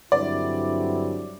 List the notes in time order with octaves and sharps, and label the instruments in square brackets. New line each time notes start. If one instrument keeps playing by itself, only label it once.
[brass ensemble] G2 D3 F#3 C4 E4 [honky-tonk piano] D5